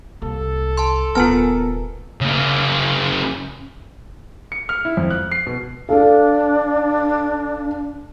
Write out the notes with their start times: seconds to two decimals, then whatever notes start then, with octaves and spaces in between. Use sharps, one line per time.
0.22 C2 A#3 A4
0.77 A5 C6
1.15 D#1 B3 F4 A#4 G#5 A5
2.21 C#3 A#3
4.52 C#7
4.69 F6
4.85 E4
4.97 F2
5.10 F#6
5.32 C7
5.47 B2
5.89 D4 A4 F5